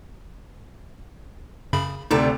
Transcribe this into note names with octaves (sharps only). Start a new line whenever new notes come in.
F#2 C#3 B5
D2 C3 D#4 A4 D5 A#5